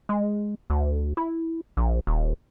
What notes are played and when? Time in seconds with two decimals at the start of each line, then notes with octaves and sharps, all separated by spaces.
0.09 G#3
0.70 D2
1.17 E4
1.77 A#1
2.07 D#1